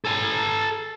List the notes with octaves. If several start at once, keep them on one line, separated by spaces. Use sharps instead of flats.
A4 G#5